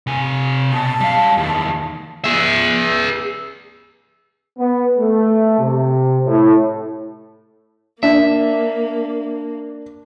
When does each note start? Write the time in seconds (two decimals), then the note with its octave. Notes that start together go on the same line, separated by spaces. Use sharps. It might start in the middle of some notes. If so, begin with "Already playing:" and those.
0.07 C3 G#5
0.73 B2 A5
1.01 G3 F5
1.37 E2 D#3
2.24 G#4 E5
4.59 B3
4.99 A3
5.60 C3
6.26 A2
8.03 A#3 D4 E5